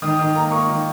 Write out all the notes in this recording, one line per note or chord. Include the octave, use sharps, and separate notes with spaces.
D#3 D#6
D#3
A#3 A#5
A#3 C#6
D#3